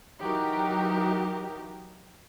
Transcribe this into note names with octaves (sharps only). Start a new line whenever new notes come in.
E3 F#3 D#4 F#4 G4 A#4